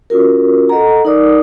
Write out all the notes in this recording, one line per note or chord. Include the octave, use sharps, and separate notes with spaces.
C#4 F4 F#4 A#4
A4 D#5 F#5 A#5
D#4 A#4 D5 D6 D#6